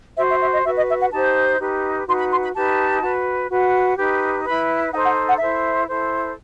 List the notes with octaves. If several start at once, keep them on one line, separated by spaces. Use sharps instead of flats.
F#4 C5 E5
E5
E5
D#5
F#4 B4 E5
D#5
E5
F#5
D#4 G4 C5 A5
D#4 G4 B4
D#4 F#4 B4 C6
B5
C6
B5
D#4 G4 B4 A5
F#4 B4
F#4 B4
D#4 G4 B4
E4 B4 B5
D#4 A4 C5 F#5
F#5
F#5
E4 A4 C5 E5
E4 A4 C5